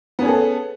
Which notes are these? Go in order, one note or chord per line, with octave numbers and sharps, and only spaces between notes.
B3 C#4 G#4 A4